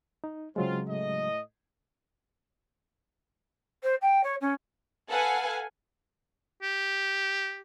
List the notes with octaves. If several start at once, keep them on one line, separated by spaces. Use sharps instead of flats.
D#4
C#3 F#3 G#3 C4 F4
A2 A3 D#5
C5
G5
C#5
C#4
A4 B4 F5 F#5 G#5
G4